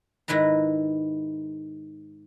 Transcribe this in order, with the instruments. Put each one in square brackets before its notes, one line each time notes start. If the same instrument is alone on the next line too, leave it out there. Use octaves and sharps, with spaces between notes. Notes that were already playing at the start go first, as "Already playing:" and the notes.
[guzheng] G#2 D#3 E4 B4 A#5